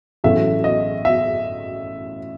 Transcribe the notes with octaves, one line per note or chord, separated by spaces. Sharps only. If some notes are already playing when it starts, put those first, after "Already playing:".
A1 A2 F#3 A3 E5
D#5
E5